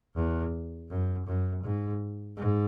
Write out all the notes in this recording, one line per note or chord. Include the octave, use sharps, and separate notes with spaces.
E2
F#2
F#2
G#2
G#2